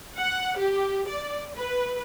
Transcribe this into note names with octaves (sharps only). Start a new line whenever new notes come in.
F#5
G4
D5
B4